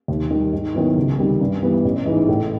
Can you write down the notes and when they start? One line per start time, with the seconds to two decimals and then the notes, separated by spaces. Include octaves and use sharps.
0.08 D#2
0.31 D#3 G3
0.53 G#2
0.74 D#3 F#3 B3 E4
0.96 C#2
1.18 C3 D#3 G3
1.41 G2
1.63 E3 G3 B3
1.85 A1
2.06 G#2 E3 G#3
2.28 A2